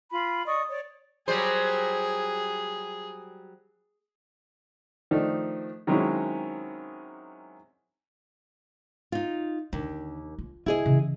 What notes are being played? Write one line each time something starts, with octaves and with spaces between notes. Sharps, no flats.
F4 B5
D5 D#5 C#6 D#6
C#5 D5
F#3 G3 G#4 C5
D#3 F3 A3 D4 D#4
D#3 F#3 G#3 C4 C#4 E4
D#4 F4
D#2 D3
F4
D3 E4 G#4 D#5
C#3 E3